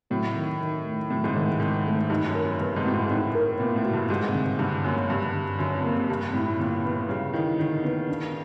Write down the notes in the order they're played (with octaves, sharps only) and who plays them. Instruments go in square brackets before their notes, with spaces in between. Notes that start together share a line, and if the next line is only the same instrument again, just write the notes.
[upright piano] A2 [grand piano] F#3
[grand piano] D#3
D#3
A3
[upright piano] A2 [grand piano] F#3
[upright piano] G#2
[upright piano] A2 [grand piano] D#3
[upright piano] G#2 [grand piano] D#3
[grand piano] A3
[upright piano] G2 [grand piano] D#4
[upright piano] F#2
[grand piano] A#4
[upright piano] F#2
[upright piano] G2 [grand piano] B3
[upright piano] G#2
[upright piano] A2 [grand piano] F#4
[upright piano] G#2
[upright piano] A2 [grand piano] D#4
[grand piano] A#4
[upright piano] A#2 [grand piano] B3
[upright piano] A2
[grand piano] F#4
[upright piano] G2
[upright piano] G#2 [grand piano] G3
[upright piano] C3
[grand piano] D3
[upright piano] G2 [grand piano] D3
[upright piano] F#2 [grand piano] A#3
[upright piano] G2 [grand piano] G3
[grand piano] D3
[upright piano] F#2 [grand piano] D3
[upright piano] F2
[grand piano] A#3
[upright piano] F2
[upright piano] G2 [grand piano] G3
[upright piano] A2 [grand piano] E4
[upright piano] A#2 [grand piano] D3
[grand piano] B3
[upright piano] C#3 [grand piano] G3
[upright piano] D#3 [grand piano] E4
[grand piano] D3 [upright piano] D#3
[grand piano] B3
D4